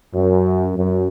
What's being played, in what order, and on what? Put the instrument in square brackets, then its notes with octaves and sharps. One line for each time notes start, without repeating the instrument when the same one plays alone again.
[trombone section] F#2
F#2